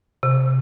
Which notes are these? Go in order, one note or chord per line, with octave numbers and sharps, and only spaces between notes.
C3